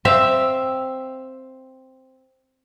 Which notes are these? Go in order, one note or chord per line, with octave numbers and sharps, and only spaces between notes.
C4 E5 F5